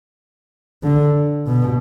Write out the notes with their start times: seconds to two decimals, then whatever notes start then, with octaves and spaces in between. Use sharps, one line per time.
0.83 D3
1.47 B2